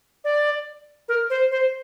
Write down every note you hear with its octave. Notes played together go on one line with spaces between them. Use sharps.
D5
A#4
C5
C5